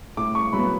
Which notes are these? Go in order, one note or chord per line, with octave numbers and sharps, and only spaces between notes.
A2 D6
C#6
F#3 B3 B5